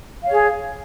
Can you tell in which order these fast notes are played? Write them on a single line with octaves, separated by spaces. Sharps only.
F5 C#5 G#4